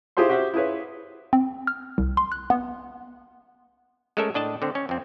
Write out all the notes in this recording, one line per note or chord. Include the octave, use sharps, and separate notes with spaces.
E4 F4 G4 G#4 C5 C6
F#4 G4 C5 E5 F#5
E4 F4 G#4 B4 C#5
C4
F6
C2
C6
F#6
B3
G#3 A3 C#4 A4 A#4 E5
A2 D4 D#5 A5
D3 C4
C#4
F2 C4